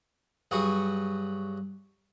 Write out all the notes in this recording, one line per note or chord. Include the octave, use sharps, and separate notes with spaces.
G2 F#3 F#4 G#4 C#6